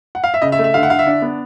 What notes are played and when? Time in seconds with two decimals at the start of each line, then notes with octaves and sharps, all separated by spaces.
0.15 F#5
0.24 F5
0.34 E5
0.42 C#3 D#5
0.52 E5
0.59 A3
0.64 E5
0.74 D3 F5
0.83 F#5
0.90 D3 F5
0.99 E5
1.07 D4
1.22 B3